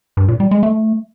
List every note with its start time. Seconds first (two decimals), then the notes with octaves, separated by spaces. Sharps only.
0.17 G2
0.28 A#2
0.40 G3
0.51 G#3
0.63 A3